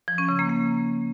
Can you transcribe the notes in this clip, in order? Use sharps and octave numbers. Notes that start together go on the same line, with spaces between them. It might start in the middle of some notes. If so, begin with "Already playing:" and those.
F3
C#4
C#3
A#3
A#3